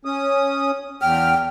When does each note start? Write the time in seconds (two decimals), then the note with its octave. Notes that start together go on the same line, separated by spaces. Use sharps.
0.05 C#4 D#6
1.01 E2 G5 F6